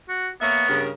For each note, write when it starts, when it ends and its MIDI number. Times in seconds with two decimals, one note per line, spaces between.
0.09 0.30 66
0.41 0.68 58
0.41 0.79 59
0.41 0.68 73
0.41 0.68 76
0.68 0.90 43
0.68 0.90 49
0.68 0.90 70